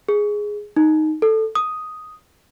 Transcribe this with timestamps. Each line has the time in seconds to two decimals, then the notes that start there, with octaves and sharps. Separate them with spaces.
0.09 G#4
0.77 D#4
1.22 A4
1.55 D#6